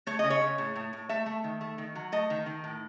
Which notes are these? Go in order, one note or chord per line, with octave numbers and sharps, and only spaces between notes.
A3 C#5
C#3 D#5
C#5
C#3
A2
A2
A2
A3 E5
A3
D#3
A3
D#3
F#3
A3 D#5
D#3
D#3
A2